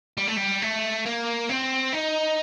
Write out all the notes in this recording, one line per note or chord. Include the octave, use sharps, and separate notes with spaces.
G3
A3
G3
A3
A#3
C4
D#4